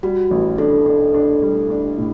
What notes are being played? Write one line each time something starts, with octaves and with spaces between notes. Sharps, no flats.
G3 F#4
A1
D4 A4
D4
D4
G3
D4
A2